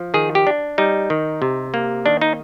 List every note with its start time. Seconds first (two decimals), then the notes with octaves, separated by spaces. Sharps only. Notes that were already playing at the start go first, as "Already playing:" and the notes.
Already playing: F3
0.14 D#3 G#4
0.35 G4
0.47 D4
0.78 G3 D#4
1.10 D#3
1.42 C3
1.74 A#3
2.06 D#3 D4
2.21 D#4